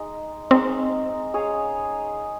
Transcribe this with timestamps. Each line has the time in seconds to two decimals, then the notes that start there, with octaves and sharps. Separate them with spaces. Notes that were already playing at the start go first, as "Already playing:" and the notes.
Already playing: G#3 D#4
0.51 G#3 C4 D#4 A#4
1.34 C#4 G#4 C#5 F5